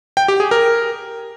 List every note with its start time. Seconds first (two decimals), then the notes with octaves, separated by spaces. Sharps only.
0.17 G5
0.28 G4
0.40 G#4
0.51 A#4